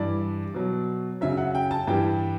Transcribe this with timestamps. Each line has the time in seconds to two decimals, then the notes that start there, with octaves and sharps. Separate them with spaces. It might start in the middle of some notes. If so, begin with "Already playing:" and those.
Already playing: G2 E3 G3 D5
0.54 B2 F#3
1.21 F#2 C#3 F#3 E5
1.37 F#5
1.55 G5
1.71 A5
1.88 G2 E3 G3 G5